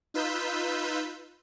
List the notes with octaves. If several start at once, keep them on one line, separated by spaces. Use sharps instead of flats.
D#4 F4 B4 E6 G6 B6